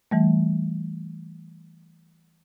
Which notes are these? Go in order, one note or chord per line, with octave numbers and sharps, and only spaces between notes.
E3 G3 A3